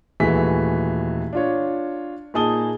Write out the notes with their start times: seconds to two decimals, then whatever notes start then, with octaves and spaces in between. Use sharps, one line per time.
0.20 D#1 E3 A3 F#4 G#4 B6
1.33 D4 F4 C#5
2.34 A#2 D#4 G#4 A5 D#6 G7